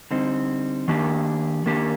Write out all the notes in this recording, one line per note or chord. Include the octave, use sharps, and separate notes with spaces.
D3 G3 C4 D#4
D#3 A#3 D4 G4
D#3 A#3 D4 G4